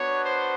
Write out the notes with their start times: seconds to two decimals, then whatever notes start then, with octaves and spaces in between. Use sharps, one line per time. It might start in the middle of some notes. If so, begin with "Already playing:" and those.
Already playing: B3 D4 F#4 C#5
0.25 C5